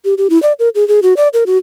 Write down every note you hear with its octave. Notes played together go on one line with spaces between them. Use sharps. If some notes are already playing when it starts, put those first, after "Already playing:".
G4
G4
E4
D5
A#4
G#4
G#4
F#4
D5
A#4
F#4